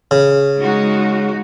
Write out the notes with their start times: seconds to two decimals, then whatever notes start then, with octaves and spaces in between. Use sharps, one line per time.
0.11 C#3
0.59 G#3 D#4 F#4